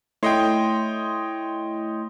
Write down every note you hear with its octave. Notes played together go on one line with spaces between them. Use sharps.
A3 E4 C#5 D#5 G5 C6